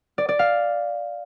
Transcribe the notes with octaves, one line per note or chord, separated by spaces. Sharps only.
D5
D5
F5